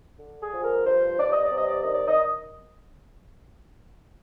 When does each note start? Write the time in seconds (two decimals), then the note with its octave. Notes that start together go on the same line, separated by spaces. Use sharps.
0.18 D3
0.41 G#4
0.52 F3
0.62 A#4
0.84 G2 C5
1.18 G2 D5
1.31 D#5
1.43 D5
1.50 C3
1.56 D#5
1.68 D5
1.81 D#3 D#5
1.93 D5
2.07 D#5